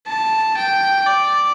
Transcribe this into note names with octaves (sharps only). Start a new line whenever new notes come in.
A5
G5
D5